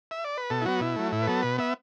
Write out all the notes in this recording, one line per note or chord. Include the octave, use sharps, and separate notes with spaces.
E5
D5
B4
B2 A4
E4
F#3 B3 F#4
B2 E4
F#3 A3
A2 E4
B4
F#3 B3 A4
B2 B4
B3 E5